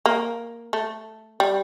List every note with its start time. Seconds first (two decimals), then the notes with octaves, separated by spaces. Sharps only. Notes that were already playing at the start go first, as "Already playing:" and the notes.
0.06 A#3
0.73 A3
1.40 G3